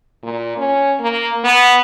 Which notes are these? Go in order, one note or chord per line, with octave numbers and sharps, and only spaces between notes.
A#2
C#4
A#3
B3